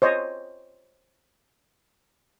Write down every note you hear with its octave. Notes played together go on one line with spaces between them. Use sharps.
C5 C#5 D#5